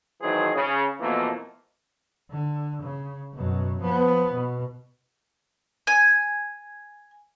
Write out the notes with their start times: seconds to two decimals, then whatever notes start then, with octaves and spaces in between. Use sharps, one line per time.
0.21 G#1 D#3 E3 F#3 G#4 C5
0.54 C#3
1.00 F2 B2 E3 A3 A#3
2.31 D3
2.83 C#3
3.34 F#2 B2
3.81 F3 B3
4.35 B2
5.87 G#5